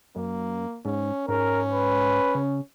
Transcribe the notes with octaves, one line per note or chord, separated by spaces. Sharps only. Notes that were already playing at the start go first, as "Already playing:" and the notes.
F#2 A#3
G#2 C#4
G#2 C#4 A#4
B4
C#3